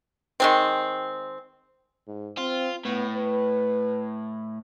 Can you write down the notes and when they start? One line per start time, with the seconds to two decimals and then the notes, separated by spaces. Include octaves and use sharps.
0.40 D#3 G#3 C4
2.08 G#2
2.38 C4 F4
2.85 A2 B3
3.17 B4